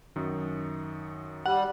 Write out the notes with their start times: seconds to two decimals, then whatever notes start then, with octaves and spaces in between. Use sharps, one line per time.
0.16 F#2 D#3
1.46 G3 F#5